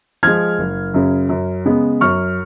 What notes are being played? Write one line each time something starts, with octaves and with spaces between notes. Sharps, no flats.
F3 G#3 F6 G#6
F#1
F#2 C#3
F#2
C#3 G#3 B3
F#2 C#6 F6